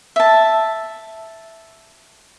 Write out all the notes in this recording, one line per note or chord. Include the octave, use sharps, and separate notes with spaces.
E5 A5